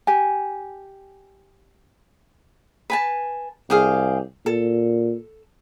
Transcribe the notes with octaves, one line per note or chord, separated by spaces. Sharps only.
G4 G#5
B4 G#5 A5
C2 G4 G#4 F5
A#2 A4